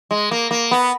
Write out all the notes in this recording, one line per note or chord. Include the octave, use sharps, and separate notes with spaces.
G#3
A#3
A#3
B3